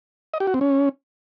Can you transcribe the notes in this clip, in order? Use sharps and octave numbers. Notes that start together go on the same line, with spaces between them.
D#5
G4
F#4
C4
C#4